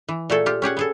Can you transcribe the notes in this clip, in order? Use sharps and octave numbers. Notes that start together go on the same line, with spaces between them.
E3
A#2 A3 G#4 A4
F4 G4
C#4 G4 G#4 F#5
B3 G#4 A4